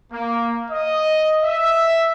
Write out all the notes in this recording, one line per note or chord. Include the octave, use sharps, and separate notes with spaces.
A#3
D#5
E5